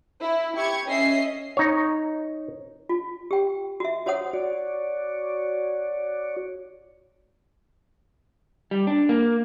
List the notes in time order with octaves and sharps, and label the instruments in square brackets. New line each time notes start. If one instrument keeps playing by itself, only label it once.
[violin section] E4
E4 G4 C#6 G#6
C#4 D#5 E5 C7
[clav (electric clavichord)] D#4 C#5
[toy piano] F4
G4 G5
F#4 E5
F#4 C5 C#5 F#5 D#6
[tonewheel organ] F#4 C#5 D5
[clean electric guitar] G3
D4
A#3